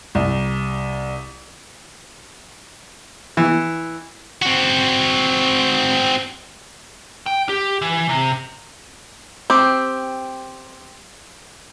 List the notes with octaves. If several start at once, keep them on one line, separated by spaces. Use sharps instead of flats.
C2
E3
C4 F#4
G5
G4
E3
C3
C4 G4